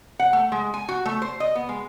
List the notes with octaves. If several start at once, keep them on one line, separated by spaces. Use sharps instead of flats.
F#5
A3
G#3
G#5
F#4
A3
C5
D#5
B3
G#3